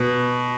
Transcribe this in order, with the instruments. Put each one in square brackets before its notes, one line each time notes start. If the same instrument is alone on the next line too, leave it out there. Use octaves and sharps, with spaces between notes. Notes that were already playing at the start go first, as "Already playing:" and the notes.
Already playing: [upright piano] B2